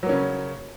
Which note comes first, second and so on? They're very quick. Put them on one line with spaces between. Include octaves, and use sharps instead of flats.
F#3 A#3 C#4 C#3